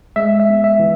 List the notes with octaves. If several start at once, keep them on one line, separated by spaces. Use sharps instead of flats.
G#3 E5
E5
B3
E5
E3